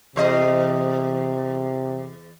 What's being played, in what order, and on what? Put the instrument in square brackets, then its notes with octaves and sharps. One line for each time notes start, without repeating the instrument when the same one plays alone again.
[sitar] E2 C5 D#5 [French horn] C3